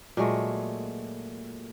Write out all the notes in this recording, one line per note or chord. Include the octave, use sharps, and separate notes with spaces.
A#2 F#3 G#3 A3